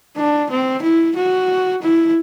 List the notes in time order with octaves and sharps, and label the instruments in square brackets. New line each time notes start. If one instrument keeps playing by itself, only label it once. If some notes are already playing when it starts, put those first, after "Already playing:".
[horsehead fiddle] D4
C4
E4
F#4
E4